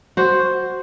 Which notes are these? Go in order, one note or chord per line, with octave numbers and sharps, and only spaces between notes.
F#4 C5